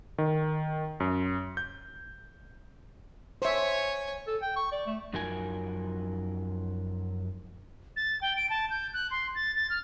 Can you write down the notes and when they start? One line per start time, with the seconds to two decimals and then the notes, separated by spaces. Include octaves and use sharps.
0.18 D#3
1.00 F#2
1.57 G6
3.42 C5 C#5 E5 G#5
4.27 A4
4.42 G5
4.56 C#6
4.72 D5
4.87 A3
5.13 F#2 F3 F#3 D#4 A#4 G#5
7.96 A6
8.21 G5
8.37 D7
8.50 A5
8.70 G6
8.94 F#6
9.11 C6
9.35 A6
9.56 A6
9.70 F6